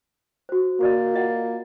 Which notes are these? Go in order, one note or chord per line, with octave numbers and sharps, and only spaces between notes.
F#4 C5
A#3 F#4 D5 D#5
F4 D#5 F#5